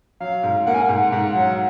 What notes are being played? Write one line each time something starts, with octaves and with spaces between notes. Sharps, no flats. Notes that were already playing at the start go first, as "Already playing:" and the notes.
F#3 F5
G#2
A#3 F#5
G#5
F#5
G#2
G#2 F#5
F#3